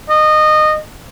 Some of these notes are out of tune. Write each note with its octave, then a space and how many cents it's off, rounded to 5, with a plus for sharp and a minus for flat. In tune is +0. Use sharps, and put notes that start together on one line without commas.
D#5 -20